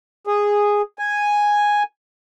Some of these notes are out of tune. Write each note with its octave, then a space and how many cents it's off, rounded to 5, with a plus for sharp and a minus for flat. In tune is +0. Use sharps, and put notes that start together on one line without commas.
G#4 -10
G#5 -5